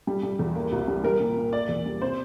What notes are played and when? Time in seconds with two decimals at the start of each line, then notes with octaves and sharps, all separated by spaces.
0.07 G3
0.23 G3
0.39 E2
0.55 A#3
0.72 C2
0.88 G3
1.04 G3 A#4
1.20 A#2
1.37 A#2
1.53 A#3 D5
1.69 E2
1.86 G3
2.02 C3 C5